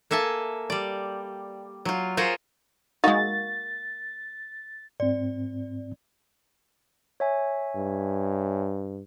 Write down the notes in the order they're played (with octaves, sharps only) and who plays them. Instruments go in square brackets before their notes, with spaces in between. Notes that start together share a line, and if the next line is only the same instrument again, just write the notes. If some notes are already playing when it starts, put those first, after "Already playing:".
[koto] A#3 A4 E5 G#5 A5
G3 D5
F#3 F4
F4 G#4 A#4 C5 C#5
[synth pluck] G#3 D#4 [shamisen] A#3 F#4 [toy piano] A#4 F5 C#6 [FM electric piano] A6
[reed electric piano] G#2 C4 [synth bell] D5
[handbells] C#5 E5 G#5
[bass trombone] G2